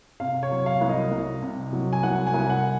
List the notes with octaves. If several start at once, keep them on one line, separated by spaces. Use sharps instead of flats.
C3 F5
C#5
F#3
F5
C2
D#5
C2
C3
F#3
G#5
C2 F#5
G#5
C2
F#5